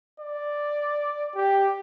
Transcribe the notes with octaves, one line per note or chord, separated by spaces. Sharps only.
D5
G4